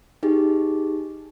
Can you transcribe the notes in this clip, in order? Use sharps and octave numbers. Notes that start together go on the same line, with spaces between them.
D#4 G4 G#4